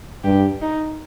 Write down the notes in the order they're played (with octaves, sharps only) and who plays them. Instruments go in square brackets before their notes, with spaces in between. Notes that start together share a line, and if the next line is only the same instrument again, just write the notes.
[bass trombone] G2 [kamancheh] G4
[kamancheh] D#4